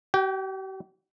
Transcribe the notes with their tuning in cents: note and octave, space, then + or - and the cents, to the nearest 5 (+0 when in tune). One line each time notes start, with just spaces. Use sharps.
G4 -45 G5 +0